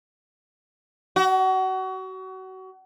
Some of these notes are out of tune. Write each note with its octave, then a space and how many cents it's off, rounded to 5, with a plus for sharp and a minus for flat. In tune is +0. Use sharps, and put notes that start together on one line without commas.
F#4 +30